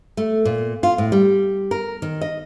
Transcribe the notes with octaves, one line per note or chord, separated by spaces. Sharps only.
A3
A#2
F4
A2
G3
A#4
D#3
D#5